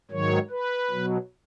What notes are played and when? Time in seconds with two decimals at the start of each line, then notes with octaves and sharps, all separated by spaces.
0.11 G#2 D#3 F#3 C#5
0.50 B4
0.90 B2 F#3